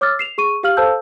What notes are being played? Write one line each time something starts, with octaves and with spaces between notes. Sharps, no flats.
C#5 D6 E6 F6 A6
C7 E7 F7
G#4 C#6 D#7
G4 F5 F6 F#7
A4 C5 F5 A5 E6 G6